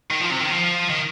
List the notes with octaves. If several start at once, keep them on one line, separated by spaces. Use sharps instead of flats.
D#3
F3
C3
D#3
F3
D#3